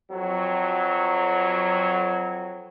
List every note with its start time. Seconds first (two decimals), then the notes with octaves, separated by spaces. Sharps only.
0.11 F2 F#3